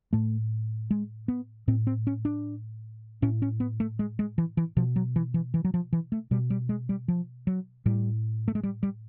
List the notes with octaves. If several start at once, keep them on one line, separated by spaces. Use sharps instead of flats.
A2 A3
G#3
B3
A2 C4
C4
C#4
D4
A2 C#4
C#4
B3
A3
G#3
G#3
E3
E3
B2 F3
F#3
E3
E3
E3
F#3
F3
E3
A3
B2 G3
G3
G#3
G3
F3
F#3
A2 G3
A3
G#3
G3
G3